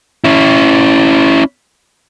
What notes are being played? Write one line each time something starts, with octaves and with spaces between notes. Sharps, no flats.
C#4 E4